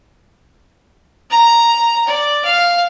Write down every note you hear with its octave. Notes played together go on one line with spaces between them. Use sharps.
A#5
D5
F5